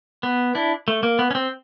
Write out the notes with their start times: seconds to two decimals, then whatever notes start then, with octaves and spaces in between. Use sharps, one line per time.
0.23 B3
0.55 D4 E4
0.88 A3
1.03 A#3
1.19 B3
1.31 C#4
1.35 C4